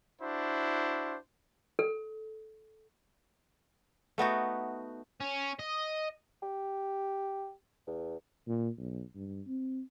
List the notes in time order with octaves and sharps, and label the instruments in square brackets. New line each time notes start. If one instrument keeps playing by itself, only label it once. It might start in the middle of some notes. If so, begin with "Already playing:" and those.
[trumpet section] D4 E4 F#4 C5
[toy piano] A4
[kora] A3 B3 D#4 F#4
[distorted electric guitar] C#4
D#5
[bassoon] G4
E2
[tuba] A#2
B1
G2
C4